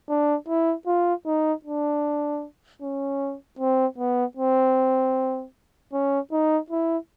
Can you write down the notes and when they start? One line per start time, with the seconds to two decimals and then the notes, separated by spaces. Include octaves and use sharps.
0.09 D4
0.48 E4
0.87 F4
1.26 D#4
1.65 D4
2.82 C#4
3.59 C4
3.98 B3
4.37 C4
5.93 C#4
6.32 D#4
6.71 E4